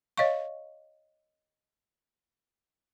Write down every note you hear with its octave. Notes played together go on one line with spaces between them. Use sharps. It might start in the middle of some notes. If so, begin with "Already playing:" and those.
C#5 D#5 F5 C#6